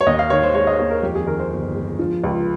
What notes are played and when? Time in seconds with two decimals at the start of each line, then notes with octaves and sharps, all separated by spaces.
0.01 C#5
0.07 D#2 D#5
0.19 F5
0.30 D#3 C#5
0.43 C5
0.54 G#3 C#5
0.67 D#5
0.79 D#2 C#5
0.90 A#4
1.03 F2 G4
1.15 G#4
1.27 D#3 A#4
1.39 C5
1.51 G1
1.75 G#3
1.99 F3
2.24 C#2